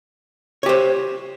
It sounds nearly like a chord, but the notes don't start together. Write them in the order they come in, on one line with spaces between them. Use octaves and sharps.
C#5 G4 C5